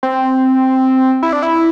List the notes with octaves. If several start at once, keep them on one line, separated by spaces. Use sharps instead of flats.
C4
E4
D4
E4